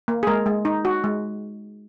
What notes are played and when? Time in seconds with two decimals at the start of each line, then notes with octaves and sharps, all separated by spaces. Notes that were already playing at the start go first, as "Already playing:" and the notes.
0.08 A#3
0.23 G#4
0.27 G#3 A#4
0.46 G#3
0.65 D#4
0.85 F#4
1.04 G#3